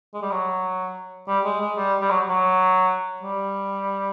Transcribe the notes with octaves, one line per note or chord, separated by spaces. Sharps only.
G#3
G3
F#3
G3
G#3
G#3
G3
G3
F#3
F#3
G3